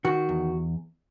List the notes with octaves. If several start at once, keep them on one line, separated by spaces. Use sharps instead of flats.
D#3 F#4
E2